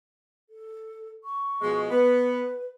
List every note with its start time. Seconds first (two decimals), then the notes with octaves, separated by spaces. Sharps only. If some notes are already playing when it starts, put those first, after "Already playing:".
0.50 A4
1.24 C#6
1.61 B2 F3 G#3
1.90 B3 B4